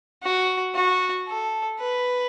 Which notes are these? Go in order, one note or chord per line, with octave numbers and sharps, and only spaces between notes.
F#4
F#4
A4
B4